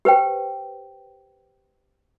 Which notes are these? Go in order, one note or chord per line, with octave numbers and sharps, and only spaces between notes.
G4 B4 C5 G5